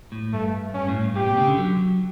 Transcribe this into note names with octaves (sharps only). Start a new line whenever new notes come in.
A2
G2 A3
G2 C#4
A2
G2
A2 G4
B2
C#3
D3
F#3